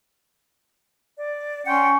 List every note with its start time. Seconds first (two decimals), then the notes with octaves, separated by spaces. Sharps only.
1.18 D5
1.67 C#4 F#5 G5 C6